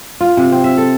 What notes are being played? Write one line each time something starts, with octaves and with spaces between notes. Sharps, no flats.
F4
C3
C4
E5
A4